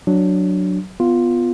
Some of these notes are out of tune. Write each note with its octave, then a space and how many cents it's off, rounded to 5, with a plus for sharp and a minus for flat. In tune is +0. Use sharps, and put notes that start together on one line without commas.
F#3 +0 D4 +0
B3 +15 F4 +0